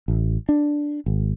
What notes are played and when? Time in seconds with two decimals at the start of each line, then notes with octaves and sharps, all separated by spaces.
0.08 A1
0.49 D4
1.06 G#1